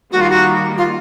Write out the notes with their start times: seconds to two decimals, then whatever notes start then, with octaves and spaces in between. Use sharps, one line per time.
0.12 D#3 G3 A#3 F#4
0.21 F4
0.30 F#4
0.78 F4